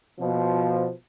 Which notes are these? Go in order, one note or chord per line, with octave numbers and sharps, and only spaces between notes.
B2 F3